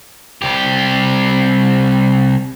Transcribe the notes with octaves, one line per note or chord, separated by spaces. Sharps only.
C2 G4